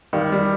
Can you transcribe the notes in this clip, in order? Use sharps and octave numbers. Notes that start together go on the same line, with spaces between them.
D#3 G3
G3